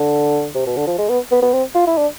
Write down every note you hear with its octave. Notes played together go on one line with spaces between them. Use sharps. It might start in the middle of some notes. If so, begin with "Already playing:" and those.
Already playing: D3
C3
B2
D3
F3
G#3
B3
B3
B3
C4
F4
E4
D4